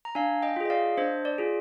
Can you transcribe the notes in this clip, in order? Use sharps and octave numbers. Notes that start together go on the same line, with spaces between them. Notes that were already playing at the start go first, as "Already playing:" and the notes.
A#5
D4 F5 G#5
D#5 G5
F4 G#4
D#5
D5 F5
D4 C5 D#5
D5
F4 G#4